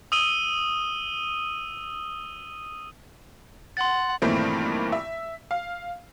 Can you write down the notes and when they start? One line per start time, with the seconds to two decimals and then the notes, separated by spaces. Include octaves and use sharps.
0.12 D#6 E6 D#7 G7
3.77 F#5 C6 A6
4.22 G2 A#2 D#3 E3 A3 C4
4.92 E5
5.51 F5